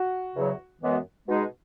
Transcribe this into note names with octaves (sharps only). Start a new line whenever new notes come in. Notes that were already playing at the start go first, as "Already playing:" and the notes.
Already playing: F#4
E2 C#3 F#3
F#2 E3 G#3 B3
B2 G#3 D#4 G#4